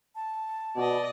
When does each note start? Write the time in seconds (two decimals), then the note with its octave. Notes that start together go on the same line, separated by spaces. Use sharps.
0.15 A5
0.77 B2 D5 D#5